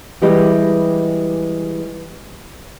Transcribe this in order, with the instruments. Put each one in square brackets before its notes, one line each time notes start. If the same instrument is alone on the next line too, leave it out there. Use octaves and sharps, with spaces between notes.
[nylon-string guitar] E3 G3 G#3 E4 G4 D#5